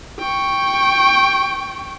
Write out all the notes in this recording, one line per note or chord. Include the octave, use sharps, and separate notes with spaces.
G5 C#6